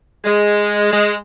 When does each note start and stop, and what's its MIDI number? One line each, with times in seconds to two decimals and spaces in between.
0.25 0.88 56
0.92 1.14 56